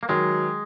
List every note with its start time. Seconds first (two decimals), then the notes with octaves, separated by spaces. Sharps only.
0.03 A#3
0.09 D#3 F#3 G#3